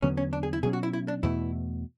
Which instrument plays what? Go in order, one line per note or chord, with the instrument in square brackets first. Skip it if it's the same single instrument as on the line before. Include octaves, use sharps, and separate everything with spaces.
[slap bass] E2 D3 F#3 B3 [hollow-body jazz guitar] C#4
[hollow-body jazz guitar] C#4
D4
G#4
E4
[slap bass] B2 F#3 C#4 [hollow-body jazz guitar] G#4
[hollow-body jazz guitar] F#4
E4
E4
D4
[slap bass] E2 B2 A3 [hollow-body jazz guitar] E4